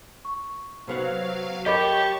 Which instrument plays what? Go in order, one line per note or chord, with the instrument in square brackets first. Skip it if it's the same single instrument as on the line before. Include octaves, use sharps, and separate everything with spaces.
[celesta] C#6
[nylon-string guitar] C3 B3 F#4 [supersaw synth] F#3 F5
[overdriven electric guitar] G4 [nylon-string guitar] A#4 C#5 [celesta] D#5 B5 D6 [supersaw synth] A5 C#6